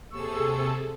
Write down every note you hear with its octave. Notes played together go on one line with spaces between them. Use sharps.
D#2 C3 G#4 A4 C#6 E6